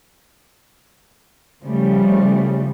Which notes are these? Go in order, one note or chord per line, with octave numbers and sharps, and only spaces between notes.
C#3 F3 G3 A3